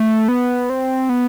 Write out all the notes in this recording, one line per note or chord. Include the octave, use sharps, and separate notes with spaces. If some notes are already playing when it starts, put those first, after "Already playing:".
Already playing: A3
B3
C4
B3